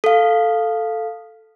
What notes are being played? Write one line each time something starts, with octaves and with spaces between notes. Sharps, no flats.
A4 F5